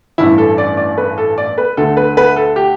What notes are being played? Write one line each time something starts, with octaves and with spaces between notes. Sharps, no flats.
A1 G2 E3 E4
A4
D5
D5
B4
A4
D5
B4
D2 D3 A4
B4
B4
A4
G4